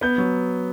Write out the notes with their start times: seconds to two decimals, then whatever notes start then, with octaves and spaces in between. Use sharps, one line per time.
0.01 B3 G6
0.18 F#3